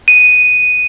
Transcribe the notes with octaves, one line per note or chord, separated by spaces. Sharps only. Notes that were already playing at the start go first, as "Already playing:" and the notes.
D#7